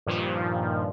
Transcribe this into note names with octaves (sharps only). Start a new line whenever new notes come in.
G2 A#2 D#3 F3